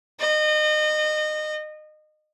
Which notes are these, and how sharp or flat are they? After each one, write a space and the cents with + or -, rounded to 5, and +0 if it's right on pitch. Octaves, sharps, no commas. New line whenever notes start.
D#5 -30